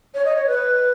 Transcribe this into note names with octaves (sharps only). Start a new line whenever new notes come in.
C#5
D#5
C#5
B4